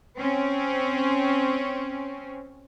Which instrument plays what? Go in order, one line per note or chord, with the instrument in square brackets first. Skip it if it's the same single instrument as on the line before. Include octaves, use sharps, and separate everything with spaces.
[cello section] C4 C#4